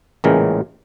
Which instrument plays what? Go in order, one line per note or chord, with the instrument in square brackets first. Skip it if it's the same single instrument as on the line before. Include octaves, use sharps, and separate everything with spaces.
[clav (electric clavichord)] A1 A#2 C#3 E3 G#3 A#4